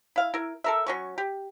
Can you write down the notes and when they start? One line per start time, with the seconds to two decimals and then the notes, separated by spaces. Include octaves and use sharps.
0.16 E4 F5
0.34 E4 A#4
0.64 A4 A#4 E5
0.86 F#3 C#4 C#6
1.18 G4